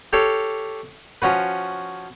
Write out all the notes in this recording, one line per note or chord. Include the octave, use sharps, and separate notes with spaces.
G4 A4 C#5 F5
F3 C#4 F#4 B4